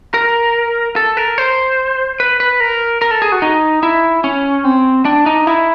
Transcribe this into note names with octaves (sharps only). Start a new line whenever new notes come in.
A#4
A4
A#4
C5
B4
B4
A#4
A#4
A4
G#4
F#4
D#4
E4
C#4
C4
D4
D#4
E4